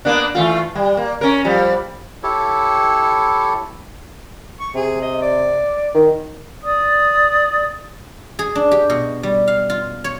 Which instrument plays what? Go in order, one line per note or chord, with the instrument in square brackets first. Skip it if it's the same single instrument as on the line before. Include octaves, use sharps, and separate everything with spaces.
[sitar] A#3 B3 D4
E3 A3 F4
G3
A#3
C#4 A#4
F3 G3
[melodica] E4 G4 A4 C#5
[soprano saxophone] C#6
[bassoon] C3 [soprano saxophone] G#4
[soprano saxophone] D#5
D5
[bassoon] D#3
[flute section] D5 D#6
[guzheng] G#4
D4
G4
B2
G3
F5
F4
C#5